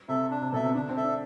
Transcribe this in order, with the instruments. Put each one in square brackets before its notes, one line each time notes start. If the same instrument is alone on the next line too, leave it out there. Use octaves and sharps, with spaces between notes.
[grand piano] C3 [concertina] A4 E5
[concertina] D4
[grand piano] C3
[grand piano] B2 [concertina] A4 E5
[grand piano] C3
[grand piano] D3 [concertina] D4
[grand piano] C4
[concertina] A4 E5
[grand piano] D4